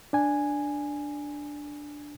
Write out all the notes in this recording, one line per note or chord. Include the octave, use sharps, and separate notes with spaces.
D4 G#5